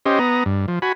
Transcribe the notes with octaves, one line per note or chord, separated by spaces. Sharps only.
C#4 G4 C5 D#5
B3 A#5 D#6
G2
F3
F#4 G#5 B5